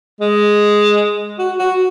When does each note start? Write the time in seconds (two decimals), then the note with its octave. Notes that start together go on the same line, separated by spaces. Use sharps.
0.21 G#3
1.39 F#4
1.59 F#4